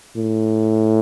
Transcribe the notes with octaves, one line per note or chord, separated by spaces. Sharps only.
A2